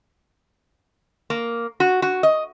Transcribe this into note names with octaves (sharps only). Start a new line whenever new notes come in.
A#3
F#4
F#4
D#5